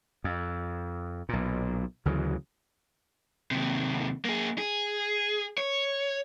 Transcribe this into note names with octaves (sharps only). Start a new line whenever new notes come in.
F2
B1 A#2
D2 C#3 E3 F#3
D#2 C3
A#3 G#4
G#4
C#5